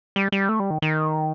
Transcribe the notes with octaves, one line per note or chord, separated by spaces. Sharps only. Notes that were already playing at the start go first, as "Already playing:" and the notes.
G3
G3
A3
G3
D#3
D#3